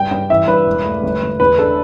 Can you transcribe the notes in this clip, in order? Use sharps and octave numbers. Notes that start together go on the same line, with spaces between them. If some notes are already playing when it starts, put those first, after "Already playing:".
Already playing: G2 G5
G2 G5
E3 E5
G2 B4
E1
A3
G1
G1
E2 B4
D4 A4